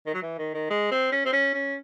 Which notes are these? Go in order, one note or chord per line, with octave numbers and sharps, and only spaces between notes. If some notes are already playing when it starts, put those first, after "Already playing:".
D#3
F#3
E3
D#3
D#3
G#3
C4
C#4
C4
C#4
C#4